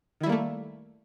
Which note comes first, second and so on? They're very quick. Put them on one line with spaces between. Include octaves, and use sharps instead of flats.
D#3 E4 G3 A#3 A3